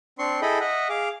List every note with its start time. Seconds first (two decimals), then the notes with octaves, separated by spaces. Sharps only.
0.19 C4 D4 C6 C#6
0.42 E4 G#4 A4 D#5 G5 B5
0.60 D#5 E5 F#5
0.89 G#4 F5 D6